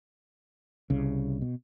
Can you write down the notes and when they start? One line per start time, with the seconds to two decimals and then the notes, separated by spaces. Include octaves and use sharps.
0.90 C2 C#3
1.42 B2